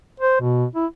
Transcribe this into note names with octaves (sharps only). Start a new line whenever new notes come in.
C5
B2
E4